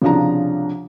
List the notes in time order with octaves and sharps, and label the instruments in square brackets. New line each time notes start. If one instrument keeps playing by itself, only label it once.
[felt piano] C2 C#3 F3 D4 A#5